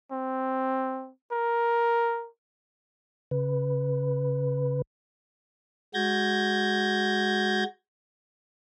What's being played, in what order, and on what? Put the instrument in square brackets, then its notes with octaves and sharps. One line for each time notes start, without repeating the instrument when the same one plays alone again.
[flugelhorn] C4
A#4
[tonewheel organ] C#3 B4
[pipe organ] G#3 F#4 G6 G#6 A#6